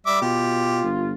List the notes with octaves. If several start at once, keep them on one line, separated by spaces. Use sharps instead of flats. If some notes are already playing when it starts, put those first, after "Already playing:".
G3 E5 D6
B2 F4 G4
G1